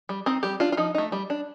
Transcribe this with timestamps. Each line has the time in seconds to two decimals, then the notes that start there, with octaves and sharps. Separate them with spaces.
0.09 G3
0.26 C4 D#4
0.43 G3 G4
0.60 D4 F4
0.72 F4
0.77 F3 D#4
0.95 A3 D#4
1.12 G3
1.30 D4